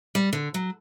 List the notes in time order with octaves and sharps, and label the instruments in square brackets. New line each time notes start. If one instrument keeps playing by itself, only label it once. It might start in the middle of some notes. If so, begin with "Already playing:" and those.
[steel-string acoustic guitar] G3
D3
F#3